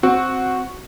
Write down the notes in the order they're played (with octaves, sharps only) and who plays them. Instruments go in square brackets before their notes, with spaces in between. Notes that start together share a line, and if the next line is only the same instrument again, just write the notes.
[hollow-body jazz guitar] C4 [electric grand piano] F#4